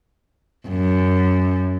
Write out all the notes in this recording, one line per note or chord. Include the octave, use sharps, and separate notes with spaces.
F#2